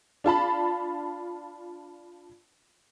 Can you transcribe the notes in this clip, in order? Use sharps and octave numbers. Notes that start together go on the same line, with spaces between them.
D4 F4 A5 B5